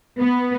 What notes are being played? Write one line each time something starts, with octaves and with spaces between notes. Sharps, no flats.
B3